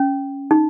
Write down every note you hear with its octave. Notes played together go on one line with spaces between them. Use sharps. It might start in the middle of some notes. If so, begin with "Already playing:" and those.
Already playing: C#4
D#4